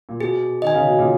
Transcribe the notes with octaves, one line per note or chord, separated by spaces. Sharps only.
A#2
B2 G#4
D#3 D#5 G#5
C#3
B2
A#2 C#3